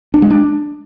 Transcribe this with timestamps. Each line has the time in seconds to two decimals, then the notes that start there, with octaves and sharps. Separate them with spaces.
0.14 D4
0.22 G#3
0.30 D4